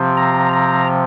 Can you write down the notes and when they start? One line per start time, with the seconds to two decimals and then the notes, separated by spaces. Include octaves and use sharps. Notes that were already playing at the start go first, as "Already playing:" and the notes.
Already playing: C3 F3 C4
0.17 A#5
0.53 A#5